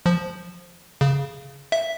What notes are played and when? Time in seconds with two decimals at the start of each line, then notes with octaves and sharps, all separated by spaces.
0.06 F3
1.01 C#3
1.72 E5